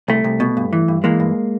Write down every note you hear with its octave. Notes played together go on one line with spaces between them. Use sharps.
C2 A3
C2
B2
G2
E3
G2
E3 G#3 A#3
G2